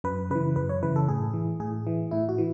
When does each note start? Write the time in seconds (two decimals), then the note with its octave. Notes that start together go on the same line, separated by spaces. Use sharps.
0.04 F#2 B4
0.30 C#3 E3 B4
0.56 F#2 B4
0.69 C#5
0.83 C#3 E3 B4
0.96 A4
1.08 A2 G#4
1.34 E3
1.60 A2 G#4
1.87 E3
2.11 A2 E4
2.29 F#4
2.38 E3